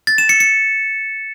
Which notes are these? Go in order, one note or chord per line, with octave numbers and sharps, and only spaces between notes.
A6
E7
C#7
C#7